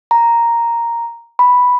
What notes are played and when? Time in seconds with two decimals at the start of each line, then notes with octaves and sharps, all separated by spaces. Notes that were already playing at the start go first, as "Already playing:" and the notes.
0.11 A#5
1.39 B5